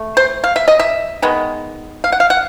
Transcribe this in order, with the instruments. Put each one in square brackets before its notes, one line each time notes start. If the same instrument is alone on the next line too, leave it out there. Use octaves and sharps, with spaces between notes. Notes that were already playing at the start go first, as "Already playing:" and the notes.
Already playing: [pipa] A3
C5
F5
E5
D#5
E5
D#3 G#3 B3
F5
F#5
F5
F#5